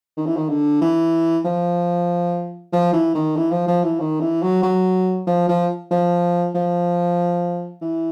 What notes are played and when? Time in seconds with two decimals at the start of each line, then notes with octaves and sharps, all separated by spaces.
0.17 D#3
0.26 E3
0.36 D#3
0.49 D3
0.82 E3
1.45 F3
2.72 F3
2.93 E3
3.15 D#3
3.36 E3
3.51 F3
3.68 F3
3.83 E3
4.00 D#3
4.20 E3
4.43 F#3
4.63 F#3
5.27 F3
5.49 F3
5.91 F3
6.55 F3
7.82 E3